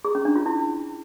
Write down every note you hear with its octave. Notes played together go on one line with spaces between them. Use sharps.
G#4
C#4
D4
F4
E4